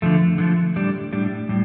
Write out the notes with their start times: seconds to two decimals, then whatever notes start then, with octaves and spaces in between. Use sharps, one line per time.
0.02 D3 F3 A3
0.38 D3 F3 A3
0.76 A2 G3 D4
1.13 A2 G3 D4
1.49 A2 G3